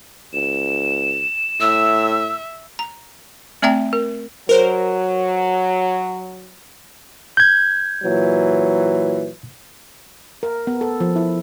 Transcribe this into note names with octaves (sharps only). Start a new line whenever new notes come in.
C#2 E7
A2 E5 E6
A#5
A3 C4 D5 E5 G5 A#5
A#4
F#3 A#4 C5
G6 G#6
A#2 E3 F#3
A#4
B3
A4
F3
E4